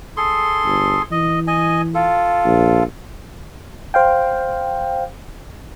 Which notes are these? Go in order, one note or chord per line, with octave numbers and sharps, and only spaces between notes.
G#4 A4 C6
G1
E3 D#5
D#5 G#5
F4 A4
A#1
C5 F5 G5